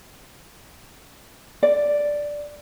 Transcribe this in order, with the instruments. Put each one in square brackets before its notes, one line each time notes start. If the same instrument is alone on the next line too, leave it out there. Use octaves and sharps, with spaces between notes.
[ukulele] D5